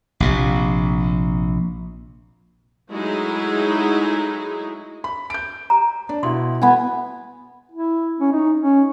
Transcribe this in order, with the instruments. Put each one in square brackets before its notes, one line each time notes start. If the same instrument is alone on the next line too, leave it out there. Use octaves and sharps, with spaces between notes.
[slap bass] A#1 C3
[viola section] F#3 G#3 A3 D#4 E4 G#4
[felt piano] B5
G6 D7
[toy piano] A#5
[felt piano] D4
[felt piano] B2 E4 [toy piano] C6
[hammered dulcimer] B3 G#5
[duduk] E4
C#4
D#4
C#4